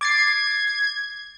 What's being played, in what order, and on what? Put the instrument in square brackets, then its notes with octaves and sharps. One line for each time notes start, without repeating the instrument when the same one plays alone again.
[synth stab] D6 A6 C7 [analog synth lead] G#6